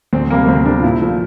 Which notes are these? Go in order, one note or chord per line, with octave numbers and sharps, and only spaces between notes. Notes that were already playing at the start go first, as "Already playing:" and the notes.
D2 C4
C3 G3 A#3
A#3
D2 C4
C3 G3 A#3 D4
F4
A#2 E4
F3 A3